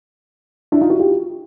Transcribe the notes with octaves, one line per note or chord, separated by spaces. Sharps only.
D4 E4
D#4 F4
E4 F#4
F4 G4